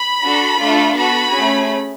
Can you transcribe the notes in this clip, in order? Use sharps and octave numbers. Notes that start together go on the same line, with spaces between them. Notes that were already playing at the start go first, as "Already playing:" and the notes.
Already playing: B5
D4 F#4 A4
A3 D4 F4 A4
B3 F#4 A4 B5
A3 C#4 G#4